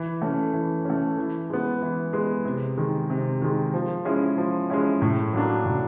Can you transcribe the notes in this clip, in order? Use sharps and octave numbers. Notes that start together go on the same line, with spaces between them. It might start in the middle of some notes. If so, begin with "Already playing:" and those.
Already playing: E3
A3 C#4
E3
A3 C#4
E3
G#3 B3
E3
G#3 B3
C3
D#3 G#3
C3
D#3 G#3
F3
G#3 C#4 E4
F3
G#3 C#4 E4
A2
F#3 A#3 D4
A2